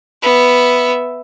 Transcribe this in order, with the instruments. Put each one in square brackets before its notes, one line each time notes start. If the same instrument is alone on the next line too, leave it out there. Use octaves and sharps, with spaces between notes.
[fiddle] B3 E5